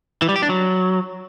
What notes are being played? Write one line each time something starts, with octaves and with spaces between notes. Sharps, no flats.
E3
G3
G4
D4
F#3